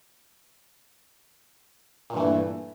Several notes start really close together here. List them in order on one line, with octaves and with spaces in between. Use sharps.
A#2 G2 E3 A3